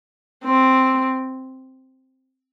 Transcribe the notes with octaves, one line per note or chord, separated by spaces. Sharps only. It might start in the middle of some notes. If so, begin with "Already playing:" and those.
C4